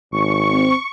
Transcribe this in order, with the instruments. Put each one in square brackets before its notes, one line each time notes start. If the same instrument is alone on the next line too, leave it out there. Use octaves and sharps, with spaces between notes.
[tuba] G#1 [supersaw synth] C#6
[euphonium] C4